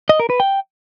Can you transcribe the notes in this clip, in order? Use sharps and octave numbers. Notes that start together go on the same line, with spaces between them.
D#5
A#4
B4
G5